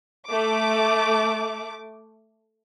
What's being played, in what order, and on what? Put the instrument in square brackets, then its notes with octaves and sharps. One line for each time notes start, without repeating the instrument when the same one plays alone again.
[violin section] A3 D6